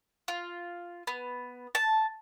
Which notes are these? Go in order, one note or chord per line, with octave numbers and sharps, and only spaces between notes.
F4
B3
A5